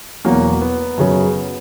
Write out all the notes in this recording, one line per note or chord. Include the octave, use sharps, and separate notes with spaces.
E2 B2 F#3 A#3
B3
F#2 C#3 F#3